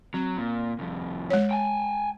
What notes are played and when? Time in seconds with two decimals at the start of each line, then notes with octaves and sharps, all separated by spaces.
0.14 F#3 C4
0.38 A#2
0.79 C2 F2
1.30 G#3 C#5
1.51 G5 G#5